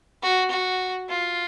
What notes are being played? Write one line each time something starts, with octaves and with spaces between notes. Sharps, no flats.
F#4
F#4
F4